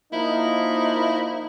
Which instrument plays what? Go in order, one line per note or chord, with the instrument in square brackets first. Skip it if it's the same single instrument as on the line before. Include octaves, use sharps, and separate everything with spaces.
[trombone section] F3 A#3 D#4 [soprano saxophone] E4